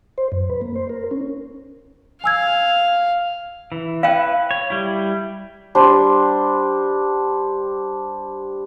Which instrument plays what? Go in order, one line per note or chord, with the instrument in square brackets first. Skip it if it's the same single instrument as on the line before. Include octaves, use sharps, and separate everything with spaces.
[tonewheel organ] C5
F#2
B4
A#3
C5
A#4
C#4
[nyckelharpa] F5 [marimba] G#5 E6 G#6
[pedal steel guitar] E3
[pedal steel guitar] E4 B4 [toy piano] F5 G5
[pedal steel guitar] C#5
G3 E4
[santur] G3 D4 C5 C6